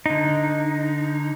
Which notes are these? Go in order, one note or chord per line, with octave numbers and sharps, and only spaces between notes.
D3 D#4